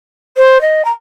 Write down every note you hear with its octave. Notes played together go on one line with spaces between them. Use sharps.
C5
D#5
A#5